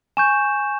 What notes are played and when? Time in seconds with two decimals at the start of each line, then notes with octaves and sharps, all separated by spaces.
0.17 G#5 C#6 G6 E7